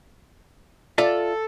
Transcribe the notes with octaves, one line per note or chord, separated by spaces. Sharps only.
F4 A4 D5 E5